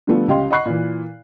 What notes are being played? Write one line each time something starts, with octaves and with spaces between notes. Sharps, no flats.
D3 F3 G3 A3 B3 F4
C#2 C#4 G4 D#5 F5 C6
D#5 F#5 B5 C#6 F#6 C7
A#2 E3